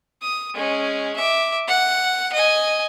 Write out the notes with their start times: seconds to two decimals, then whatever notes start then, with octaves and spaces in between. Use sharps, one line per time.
0.22 D#6
0.54 G#3 C#4
1.16 E5 D6
1.68 F#5
2.33 D#5 G#5